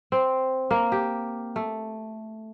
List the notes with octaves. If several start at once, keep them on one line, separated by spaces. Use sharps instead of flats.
C4
A#3
G4
A3